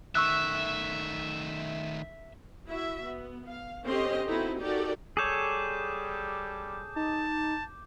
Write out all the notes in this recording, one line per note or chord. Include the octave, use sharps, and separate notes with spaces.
D#3 A3 E5 C#6 E6 F#6
E4 F#4 E5
B3
F5
D3 C4 C#4 G4 D#5 C6
B3 C4 D#4 E4 F#4 A4
D#4 F#4 G4 A4 A#4 D5
G3 G#4 A4 C#5 D6 G6
D#4 A5